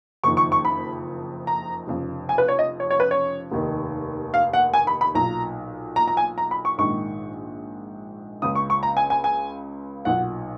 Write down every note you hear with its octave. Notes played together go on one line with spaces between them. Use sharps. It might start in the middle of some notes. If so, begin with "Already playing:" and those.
F#1 F2 D#3 C#6
C#6
C#6
B5
A#5
F1 F2 C#3
G#5
B4
C#5
D#5
C#5
C#5
B4
C#5
F1 D#2 D#3
F5
F#5
G#5
B5
B5
B1 A#2 A#5
A#5
A#5
G#5
A#5
B5
C#6
A#1 G#2 D#3 C#6
C#2 C#3 D#6
C#6
C#6
A#5
G#5
G#5
G#5
B1 A#2 F#5